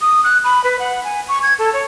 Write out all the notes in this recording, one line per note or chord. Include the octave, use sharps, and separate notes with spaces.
D#6
F#6
B5
B4
F#5
G#5
C#6
G#6
A4
C#5